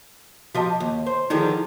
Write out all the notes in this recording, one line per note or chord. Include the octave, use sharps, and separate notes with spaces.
F3 F#4 G4 D#5 A5
D#2
C5
D3 D#3 F3 D#4 E4 G#4